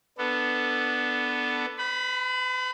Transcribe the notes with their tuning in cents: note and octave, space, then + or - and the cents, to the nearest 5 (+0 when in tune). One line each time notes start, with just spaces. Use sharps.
B3 +0 D4 +0 A4 +15
B4 +45 B5 +0